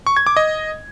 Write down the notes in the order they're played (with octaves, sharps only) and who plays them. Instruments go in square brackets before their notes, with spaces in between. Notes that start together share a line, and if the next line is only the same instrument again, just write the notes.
[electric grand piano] C#6
G#6
D6
D#5